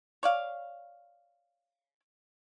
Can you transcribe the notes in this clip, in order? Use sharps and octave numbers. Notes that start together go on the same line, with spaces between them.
C#5 D5 F5